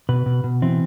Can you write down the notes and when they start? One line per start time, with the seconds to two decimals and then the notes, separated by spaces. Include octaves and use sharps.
0.09 B2 B4
0.26 B2
0.44 B2
0.62 E3 C4